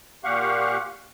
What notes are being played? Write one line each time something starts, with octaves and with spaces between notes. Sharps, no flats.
A#2 G4 F5 F#5 C#6